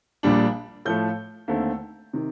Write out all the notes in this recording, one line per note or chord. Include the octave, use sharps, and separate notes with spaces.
A#1 A#2 G3 D4
A2 F3 A3 G6
D#2 D3 A3 C4
C3 D#3